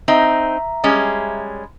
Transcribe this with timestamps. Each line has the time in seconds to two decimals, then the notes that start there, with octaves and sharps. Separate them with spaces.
0.08 C4 D#4 E5 A#5
0.84 G3 G#3 C#4